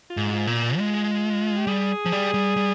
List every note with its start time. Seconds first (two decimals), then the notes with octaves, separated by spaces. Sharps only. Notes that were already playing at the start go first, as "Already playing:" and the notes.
0.10 F4
0.17 G#2
0.33 F4
0.47 A#2
0.55 F4
0.78 G#3
1.57 G4
1.67 G3 G#4
2.06 F3
2.12 G3
2.34 G3
2.56 G3